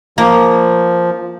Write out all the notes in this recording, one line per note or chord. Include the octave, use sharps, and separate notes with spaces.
F3 A#3